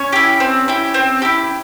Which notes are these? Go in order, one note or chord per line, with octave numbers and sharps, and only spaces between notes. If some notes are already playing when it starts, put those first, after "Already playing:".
Already playing: C#4 C#5
E4 G4
C4
E4 G4
C4
E4 G4